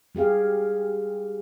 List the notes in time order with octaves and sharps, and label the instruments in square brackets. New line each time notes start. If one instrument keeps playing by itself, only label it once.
[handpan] G3 G4 G#4 F5